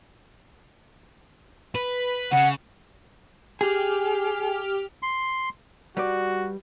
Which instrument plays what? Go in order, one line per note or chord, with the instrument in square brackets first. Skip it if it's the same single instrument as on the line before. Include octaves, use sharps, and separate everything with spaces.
[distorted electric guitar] B4
[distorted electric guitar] C#3 [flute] F#5
[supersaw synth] G4 F6 [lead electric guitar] G#4
[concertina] C6
[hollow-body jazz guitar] G3 B4 D5 [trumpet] F#4